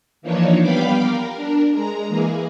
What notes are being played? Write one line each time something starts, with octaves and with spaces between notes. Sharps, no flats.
E3 F3 A#3 D4 D#4 C#5
G3 B3 F5 G5 B5 D6
A#4
D4 A#4
G#3 A#5
E3 A#3 G#4